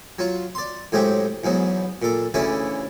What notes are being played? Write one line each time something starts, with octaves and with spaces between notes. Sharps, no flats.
F#3 F4
D5 C6
A2 F#3 G#3 C4 G4
E2 G#2 F#3 B3
A#2 A4
D2 C#3 E3 C#4 E4 D5